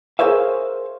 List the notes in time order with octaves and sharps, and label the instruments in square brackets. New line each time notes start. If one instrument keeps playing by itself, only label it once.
[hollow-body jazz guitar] G#4 A#4 C5 C#5 E5 F5